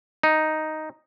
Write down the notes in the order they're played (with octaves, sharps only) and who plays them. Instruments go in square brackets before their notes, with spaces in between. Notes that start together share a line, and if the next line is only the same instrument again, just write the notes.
[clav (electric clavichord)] D#4